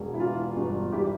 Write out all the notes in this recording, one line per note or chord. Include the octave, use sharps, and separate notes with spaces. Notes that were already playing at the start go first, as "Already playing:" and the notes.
Already playing: E1
E4
E3 F4
G1
E3 E4 G4